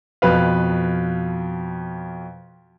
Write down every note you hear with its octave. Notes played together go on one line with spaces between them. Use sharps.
F2 B2 B4 F5